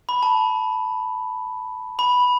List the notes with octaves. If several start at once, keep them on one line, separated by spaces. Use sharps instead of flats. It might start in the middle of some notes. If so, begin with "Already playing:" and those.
B5
A5
B5